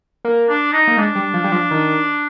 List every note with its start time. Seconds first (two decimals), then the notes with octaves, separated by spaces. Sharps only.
0.25 A#3
0.49 D4
0.73 D#4
0.88 A#3
0.97 G#3 D4
1.16 G3
1.34 F3
1.44 G3
1.52 F3
1.71 D#3